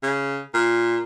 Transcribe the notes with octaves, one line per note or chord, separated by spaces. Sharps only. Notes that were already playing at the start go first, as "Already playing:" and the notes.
C#3
A#2